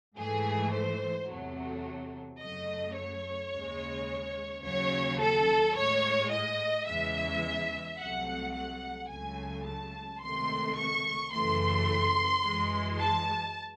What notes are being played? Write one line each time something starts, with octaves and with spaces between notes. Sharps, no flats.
G#2 E3 A3 G#4
C5
E2 C3 F#3 A3
F#2 C#3 F#3 A3 D#5
C#5
D#2 C#3 G#3
D#2 C#3 F#3 C#5
A4
A2 G#3 C#5
D#5
E2 C#3 E3 G#3 E5
C2 C3 F#3 A3 F#5
F#5
C#2 C#3 F#3 A3 G#5
A5
C#2 C3 D#3 A3 C6
C#6
F#2 C#3 E3 A3 C6
F#2 E3 G#3
A5